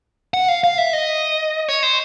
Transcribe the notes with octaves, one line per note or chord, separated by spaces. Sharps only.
F#5
F5
F5
E5
D#5
C#5
C5